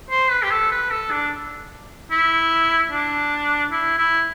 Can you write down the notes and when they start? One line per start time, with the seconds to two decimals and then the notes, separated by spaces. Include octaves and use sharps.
0.10 C5
0.31 B4
0.43 G4
0.51 A4
0.71 B4
0.91 A4
1.11 D4
2.11 E4
2.92 D4
3.72 E4
3.98 E4